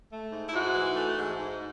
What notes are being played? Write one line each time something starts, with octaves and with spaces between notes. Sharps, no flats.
A3
G#2
E4
G#2 F#4
E3
A3
G#2
G#2